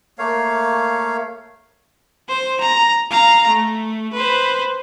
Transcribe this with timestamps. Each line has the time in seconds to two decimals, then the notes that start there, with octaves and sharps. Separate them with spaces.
0.18 A3 A#3 C#5 F5
2.29 C5
2.61 A#5
3.11 F5 A#5
3.48 A3
4.13 B4 C5